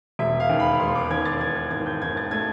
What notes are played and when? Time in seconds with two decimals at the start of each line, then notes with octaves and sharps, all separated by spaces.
0.19 E1 E5
0.40 F5
0.49 D#2
0.60 B5
0.80 E1 C6
0.95 D6
1.11 D#2 G#6
1.25 A6
1.40 E3 G#6
1.56 G#6
1.71 G#1 G#6
1.86 G6
2.02 G#1 G#6
2.17 A6
2.31 A3 G#6